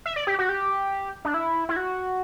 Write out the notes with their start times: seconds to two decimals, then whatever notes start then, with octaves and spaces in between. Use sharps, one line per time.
0.06 E5
0.16 D5
0.27 G4
0.39 F#4
0.49 G4
1.25 D4
1.34 E4
1.69 E4
1.76 F#4